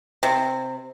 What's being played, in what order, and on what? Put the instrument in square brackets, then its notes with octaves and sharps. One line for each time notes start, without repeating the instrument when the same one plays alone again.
[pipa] C3